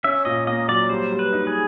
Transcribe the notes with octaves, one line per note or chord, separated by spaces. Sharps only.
C#4 E5
A#2 D#5
A#3 D#5
F#3 D5
G3 C5
G3
B4
D#4
G#4